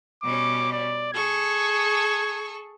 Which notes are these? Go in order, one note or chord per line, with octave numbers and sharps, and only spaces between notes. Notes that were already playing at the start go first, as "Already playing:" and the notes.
B2 G3 C#4 D6
D5
G#4 A4 C#6 G#6